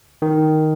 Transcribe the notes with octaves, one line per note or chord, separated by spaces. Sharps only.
D#3